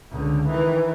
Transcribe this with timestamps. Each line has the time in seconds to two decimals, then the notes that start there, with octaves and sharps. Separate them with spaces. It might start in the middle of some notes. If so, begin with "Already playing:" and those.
0.11 C#2 D3
0.47 D#3 E3